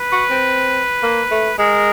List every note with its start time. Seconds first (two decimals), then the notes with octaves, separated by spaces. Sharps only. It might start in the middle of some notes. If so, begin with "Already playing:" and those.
Already playing: B4
0.12 F#4
0.30 C4
1.03 A#3
1.31 A3
1.59 G#3 A#4